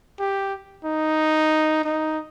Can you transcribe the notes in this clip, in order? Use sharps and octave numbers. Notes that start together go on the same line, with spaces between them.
G4
D#4
D#4